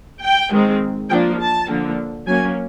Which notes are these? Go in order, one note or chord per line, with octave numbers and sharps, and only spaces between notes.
G5
D#3 G#3 C4
F3 A#3 D4 G5
A5
D3 F3 A#3
F#3 A#3 C#4 G#5